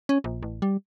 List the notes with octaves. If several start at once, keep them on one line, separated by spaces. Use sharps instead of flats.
C#4
A#1
A1
G3